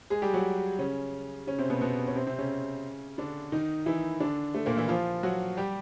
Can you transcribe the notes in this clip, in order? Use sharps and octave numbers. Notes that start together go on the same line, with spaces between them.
G#3 G#4
G3 G4
F#3 F#4
C#3 C#4
C#3 C#4
C3 C4
B2 B3
B2 B3
C#4
C3 C4
C3 C4
C#3 C#4
D3 D4
D#3 D#4
E3 E4
D3 D4
A3
A#2 A#3
E3 E4
F3 F4
F#3 F#4
G3 G4